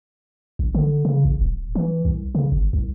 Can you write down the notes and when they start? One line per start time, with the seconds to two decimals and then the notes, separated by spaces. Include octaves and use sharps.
0.59 A1
0.75 D3
1.05 C#3
1.25 A1
1.41 D1
1.75 E3
2.05 C2
2.35 C#3
2.52 G1
2.73 C2